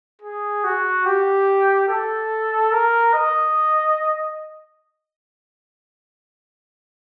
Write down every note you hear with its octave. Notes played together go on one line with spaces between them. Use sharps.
G#4
F#4
G4
A4
A#4
D#5